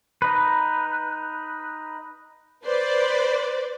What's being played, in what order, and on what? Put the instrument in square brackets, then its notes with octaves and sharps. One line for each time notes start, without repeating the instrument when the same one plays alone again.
[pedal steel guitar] D#4 B4
[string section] B4 C5 D5